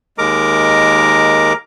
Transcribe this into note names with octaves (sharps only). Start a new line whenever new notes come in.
D#2 G#3 A#4 A#5 D6